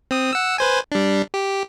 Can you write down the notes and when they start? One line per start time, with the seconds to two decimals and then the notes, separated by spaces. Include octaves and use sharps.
0.11 C4 D#6
0.33 F#5 E6
0.58 B4 C5 G#5
0.92 G3 D4
1.34 G4